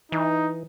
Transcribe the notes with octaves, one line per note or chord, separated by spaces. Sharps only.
E3 D#4